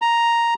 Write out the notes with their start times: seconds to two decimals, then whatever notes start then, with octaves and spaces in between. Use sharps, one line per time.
0.02 A#5